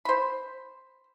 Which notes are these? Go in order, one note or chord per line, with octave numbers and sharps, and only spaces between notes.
C5 B5